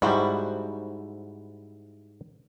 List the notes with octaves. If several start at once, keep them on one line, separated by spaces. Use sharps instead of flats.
G#2 G3 E4 F#4 C5